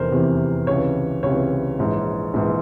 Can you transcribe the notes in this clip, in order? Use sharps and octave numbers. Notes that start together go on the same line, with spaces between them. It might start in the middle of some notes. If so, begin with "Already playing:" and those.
Already playing: F1 E2 C3 E3 A#4 C5
F1 E2 C3 E3
C#2 C3 E3 C#5
C#2 C3 E3 C#5
A#1 G#2 E3
A#1 G#2 E3